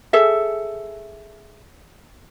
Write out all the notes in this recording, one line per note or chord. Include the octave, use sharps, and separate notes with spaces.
G#4 A4 E5